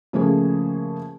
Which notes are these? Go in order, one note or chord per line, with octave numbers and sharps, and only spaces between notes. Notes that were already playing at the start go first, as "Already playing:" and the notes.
C#3 F3 A3 A#3 G#4